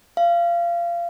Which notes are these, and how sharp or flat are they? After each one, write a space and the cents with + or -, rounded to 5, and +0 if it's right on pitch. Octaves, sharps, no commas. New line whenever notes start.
F5 -25